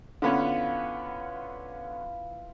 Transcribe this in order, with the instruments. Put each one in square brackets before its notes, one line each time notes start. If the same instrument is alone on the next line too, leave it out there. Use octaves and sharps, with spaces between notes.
[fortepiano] D3 B3 C#4 [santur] E4 F4 B4